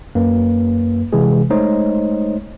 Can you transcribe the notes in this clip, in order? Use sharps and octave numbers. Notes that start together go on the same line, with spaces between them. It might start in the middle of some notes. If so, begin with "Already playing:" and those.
F#2 A#3 B4
C3 E3 G#3 G#4
G#3 A3 D#4 C5 C#5 D#5